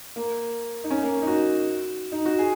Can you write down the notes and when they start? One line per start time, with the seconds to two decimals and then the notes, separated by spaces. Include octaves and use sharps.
0.16 A#3
0.84 D#4
0.91 C#4
1.03 A#3
1.22 D#4
1.27 F#4
2.12 D#4
2.25 F#4
2.39 G#4